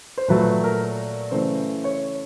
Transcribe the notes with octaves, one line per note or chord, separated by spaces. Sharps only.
C5
A#2 F#3 A3 B4
A#4
C#3 E3 A3 C5
C#5